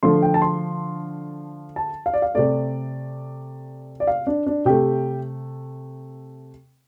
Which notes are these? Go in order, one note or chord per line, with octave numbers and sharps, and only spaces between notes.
D3 F3 A3 C6
G5
A5
C6
A5
F5
D5
F5
C3 A3 D5
D5
F5
D4
D4
C3 A3 G4